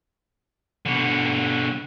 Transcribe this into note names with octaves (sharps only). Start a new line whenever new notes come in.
B2 D3